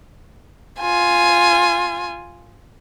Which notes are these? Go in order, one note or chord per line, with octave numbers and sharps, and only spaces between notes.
F4 G#5